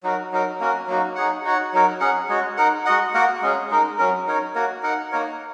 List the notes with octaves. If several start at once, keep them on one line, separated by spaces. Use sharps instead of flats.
F#3 D#4 F#4 A#4
F#3 D#4 A#4
A#3 C#4 F#4 A#4
F#3 A#3 D#4 F#4
D#4 G#4 C#5 F#5
D#4 F#4 C#5 F#5
F#3 D#4 A#4 C#5
C#4 G#4 F#5
G#3 F#4 C#5
D#4 A#4 F#5
G#3 F#4 D#5 F#5
A#3 F#4 A#4 F#5
G#3 C#4 G#4
G#3 D#4 A#4
F#3 C#4 A#4
D#4 A#4 C#5
A#3 F#4 A#4 C#5
D#4 A#4 F#5
A#3 D#4 A#4 C#5